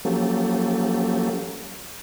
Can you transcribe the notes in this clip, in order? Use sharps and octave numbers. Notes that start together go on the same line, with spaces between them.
F3 F#3 A#3 C#4 G4 A4